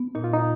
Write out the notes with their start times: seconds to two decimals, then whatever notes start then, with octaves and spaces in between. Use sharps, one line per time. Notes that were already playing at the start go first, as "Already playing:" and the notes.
Already playing: B3
0.15 A#2 D#4
0.24 F4
0.33 D#4